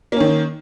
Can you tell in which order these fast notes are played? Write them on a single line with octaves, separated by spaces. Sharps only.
A#3 C#4 D#3